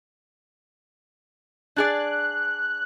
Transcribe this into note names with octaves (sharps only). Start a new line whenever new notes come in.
D4 G#4 D5 F#6